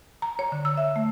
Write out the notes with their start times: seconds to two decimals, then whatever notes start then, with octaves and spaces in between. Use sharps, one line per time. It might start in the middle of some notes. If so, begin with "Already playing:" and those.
0.22 A#5
0.39 C#5
0.52 D3
0.65 E6
0.77 E5
0.96 A3